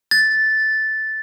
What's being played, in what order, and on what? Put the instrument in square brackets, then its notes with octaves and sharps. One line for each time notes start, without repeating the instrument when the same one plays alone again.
[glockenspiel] A6